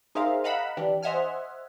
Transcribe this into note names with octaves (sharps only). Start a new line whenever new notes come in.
D#4 G#4 A#4 C5 E5 F5
D#5 F5 F#5 A#5 B5 E6
E3 D4 G4
C5 D#5 E5 F#5 G#5 F6